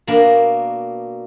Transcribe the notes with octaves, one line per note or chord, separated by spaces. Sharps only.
B2 A#3 D4 A#4